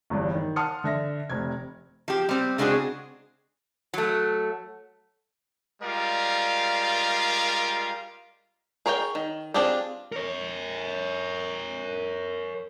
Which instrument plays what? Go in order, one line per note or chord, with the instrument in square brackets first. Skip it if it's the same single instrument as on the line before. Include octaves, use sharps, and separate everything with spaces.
[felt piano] G1 E2 G2
D#3
F#5 A5 C6 D#6 F6 C#7
D3 E5 A#6
F1 C3 G#6
[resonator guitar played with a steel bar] F3 G4
G3 C4
C#3 G#3 C4 D4 F#4 G#4
F#3 A3
[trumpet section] G3 G#3 F4 A#4 D5 F5
[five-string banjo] G#4 A#4 C#5 D5 G5
D#3
C4 D4 F4 G4 G#4
[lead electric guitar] A#4 C#5